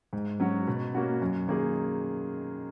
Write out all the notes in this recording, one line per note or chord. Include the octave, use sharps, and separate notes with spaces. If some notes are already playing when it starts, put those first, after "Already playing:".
G#2
F#3 C#4 F#4
B2
A#3 C#4 F#4
F#2
D#3 A#3 D#4 G#4